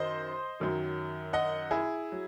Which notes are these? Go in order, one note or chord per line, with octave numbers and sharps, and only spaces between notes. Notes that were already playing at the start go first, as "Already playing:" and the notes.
Already playing: F#2 D#3 C5 D#5
F#2 D#3 F#3
D#5 F#5
E4 G#4
F#3